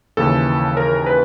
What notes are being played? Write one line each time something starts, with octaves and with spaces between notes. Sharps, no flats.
D#2 C#3 E3 A4
A#4
B4